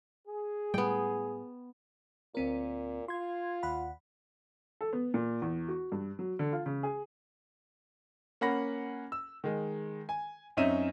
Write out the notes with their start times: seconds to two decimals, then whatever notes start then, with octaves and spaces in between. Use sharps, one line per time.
0.27 G#4
0.74 A2 G3 G#3 B3 G5
2.35 D2 A#2 C4 A#4
3.08 F4 C6 G#6
3.63 D#2 F#5 B5
4.81 A4
4.93 B3
5.14 A#2
5.42 E2
5.68 F#4
5.92 G2
6.19 F#3
6.39 D3
6.53 F4
6.66 C#3
6.83 G#4
8.41 A#3 C#4 F#5 B5 A#6
9.12 E6
9.44 D#3 G#3
10.09 G#5
10.57 F#2 C4 C#4 D#4 E5 D#7